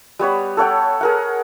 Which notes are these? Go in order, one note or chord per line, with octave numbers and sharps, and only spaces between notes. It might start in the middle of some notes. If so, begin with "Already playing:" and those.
G3 B3 C#5 B5
A4 C#5 F#5 G5
G#4 A#4 F#5